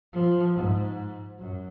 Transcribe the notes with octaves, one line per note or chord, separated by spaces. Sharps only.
F3
G#2
F#2